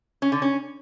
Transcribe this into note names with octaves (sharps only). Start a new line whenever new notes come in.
C#4
D3
C#4